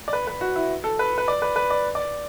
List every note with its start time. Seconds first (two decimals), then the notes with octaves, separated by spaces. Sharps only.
0.08 D5
0.13 B4
0.27 B4
0.41 F#4
0.56 E4
0.84 A4
0.99 B4
1.18 B4
1.28 D5
1.42 B4
1.56 B4
1.70 D5
1.95 D5